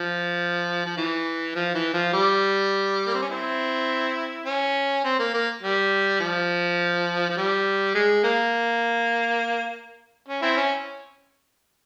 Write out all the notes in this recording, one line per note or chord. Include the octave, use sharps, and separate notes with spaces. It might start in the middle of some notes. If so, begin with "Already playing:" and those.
Already playing: F3
F3
E3
F3
E3
F3
G3
A#3
C4
C#4
C4 E4
C#4
C4
A#3
A#3
G3
F3
F3
G3
G#3
A#3
C#4
C4 E4
C#4